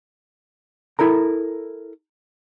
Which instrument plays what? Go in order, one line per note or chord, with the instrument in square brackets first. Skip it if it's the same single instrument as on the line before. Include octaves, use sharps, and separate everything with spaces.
[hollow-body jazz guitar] E4 A4 A#4 A#5